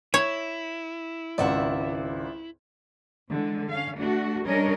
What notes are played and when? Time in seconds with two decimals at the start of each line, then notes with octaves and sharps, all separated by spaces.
0.14 E4 C#5
1.38 G#1 C#2 D5 E5 F#5
3.30 D3 E3 G#3
3.70 C#4 F5
3.99 A3 D4 F#4
4.45 G3 C#4 D4 A#4 C#5 D#5